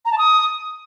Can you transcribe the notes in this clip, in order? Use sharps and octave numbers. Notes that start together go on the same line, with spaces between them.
A#5
A5
D#6